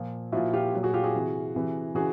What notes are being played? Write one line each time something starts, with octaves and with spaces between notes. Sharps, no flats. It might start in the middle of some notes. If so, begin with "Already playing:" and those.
Already playing: A#2 F3
A#2 F3 E4 F#4
F4 G4
A#2 F#3
F#4 G#4
F4 G4
F#4 G#4
C3 E3
C3 E3
C#3 E3 F#4 G#4